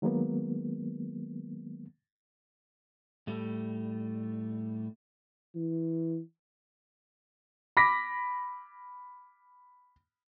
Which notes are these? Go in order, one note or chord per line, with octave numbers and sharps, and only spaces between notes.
D#3 F#3 G#3 A#3 B3
A2 G3 A3
E3
B5 D6 A#6 B6